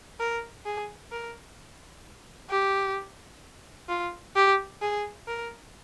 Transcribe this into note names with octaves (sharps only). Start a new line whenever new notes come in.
A#4
G#4
A#4
G4
F4
G4
G#4
A#4